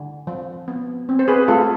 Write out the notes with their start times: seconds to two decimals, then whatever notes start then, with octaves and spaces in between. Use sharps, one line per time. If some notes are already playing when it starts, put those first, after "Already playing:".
Already playing: D3
0.27 F3
0.68 B3
1.09 C4
1.19 C5
1.28 G#4 B4
1.48 A3 F4 A4